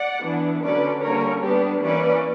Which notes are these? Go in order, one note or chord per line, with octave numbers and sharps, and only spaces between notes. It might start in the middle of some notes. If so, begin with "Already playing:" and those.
Already playing: D5 F#5
E3 B3 D4
D3 F#3 C#4 B4 D5
D3 G3 A#3 C#4 A#4 C#5
G3 B3 D4 G4 B4
E3 A#3 C#4 B4 D5